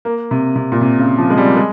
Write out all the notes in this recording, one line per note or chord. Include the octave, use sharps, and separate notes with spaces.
A#3
C3
C3
A#2
C3
C#3
F3
G#3
G3
G#3